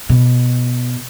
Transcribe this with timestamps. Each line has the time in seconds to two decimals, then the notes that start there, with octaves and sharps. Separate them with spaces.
0.10 B2